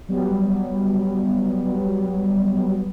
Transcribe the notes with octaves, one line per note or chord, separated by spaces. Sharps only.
F#3 G3 B3